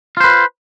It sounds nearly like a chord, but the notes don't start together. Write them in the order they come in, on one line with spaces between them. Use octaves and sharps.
F4 C5 B4